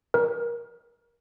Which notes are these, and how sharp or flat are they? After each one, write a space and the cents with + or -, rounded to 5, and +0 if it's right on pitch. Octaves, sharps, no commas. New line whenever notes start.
A#4 +25